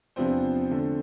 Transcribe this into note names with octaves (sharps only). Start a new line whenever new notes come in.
E2 C3 F3 B3 C4 D4 C5
D3 A3 D4